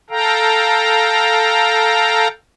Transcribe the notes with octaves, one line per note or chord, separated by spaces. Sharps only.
A4 F5 G5 A#5